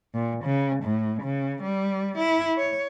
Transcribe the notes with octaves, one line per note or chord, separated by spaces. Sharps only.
A#2
C#3
A2
C#3
G3
E4
C#5